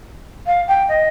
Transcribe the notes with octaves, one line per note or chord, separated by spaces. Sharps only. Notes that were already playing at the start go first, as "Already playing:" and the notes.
F5
G5
D#5